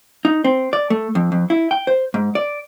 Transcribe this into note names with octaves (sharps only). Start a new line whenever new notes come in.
D#4
C4
D5
A3
F2
F2
E4
G5
C5
G#2
D5